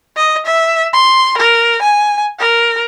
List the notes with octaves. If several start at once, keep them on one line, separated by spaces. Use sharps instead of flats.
D#5
E5
C6
A#4
G#5
A#4